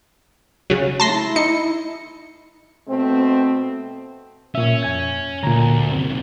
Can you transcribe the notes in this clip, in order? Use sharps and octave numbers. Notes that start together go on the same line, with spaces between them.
C#3 F#3
A3 A5 C6 A#6
E4
D#4 C#7
B2 A3 C4
A#2 C#4 E5
F2 G#5 G#6
D2 A#2 A#5
C2 F#2 C4